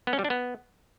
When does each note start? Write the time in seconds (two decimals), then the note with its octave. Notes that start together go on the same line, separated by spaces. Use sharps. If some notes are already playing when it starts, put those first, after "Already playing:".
0.07 B3
0.13 C#4
0.19 G3
0.24 D4
0.30 B3